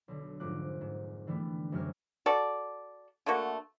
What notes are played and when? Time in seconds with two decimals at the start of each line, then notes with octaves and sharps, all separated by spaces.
0.08 B1 D3
0.40 F1 G#2 F4 D6 F#6
0.81 G#2
1.27 D3 E3 G3 A3 B3
1.72 F#1 F#2 C3 G4 F6 G#6
2.26 F#4 A4 D5
3.26 D3 A3 A#3 F#4